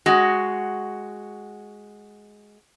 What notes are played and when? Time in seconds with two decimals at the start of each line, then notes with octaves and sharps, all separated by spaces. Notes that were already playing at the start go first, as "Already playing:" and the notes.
0.06 G#3 F#4